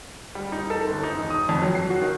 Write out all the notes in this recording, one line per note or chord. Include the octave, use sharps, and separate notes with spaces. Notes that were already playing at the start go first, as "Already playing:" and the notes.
G3
D#4
A4
G1
D#4
E1
D#6
F2
F#3
C7
F#4
D#3